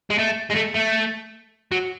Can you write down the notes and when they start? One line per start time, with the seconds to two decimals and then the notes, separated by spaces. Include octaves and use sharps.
0.10 G#3
0.18 A3
0.51 G#3
0.56 A3
0.75 A3
1.71 F#3